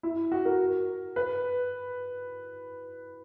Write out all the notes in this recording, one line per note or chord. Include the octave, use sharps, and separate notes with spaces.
E4
F#4
A#4
B4